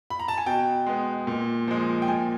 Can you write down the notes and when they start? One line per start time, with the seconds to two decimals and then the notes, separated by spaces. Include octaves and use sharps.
0.10 B5
0.19 A#5
0.28 A5
0.38 G#5
0.46 B2 G5
0.86 G#3 B3
1.27 A#2
1.68 F3 G#3
2.02 G5
2.08 A#2 G#5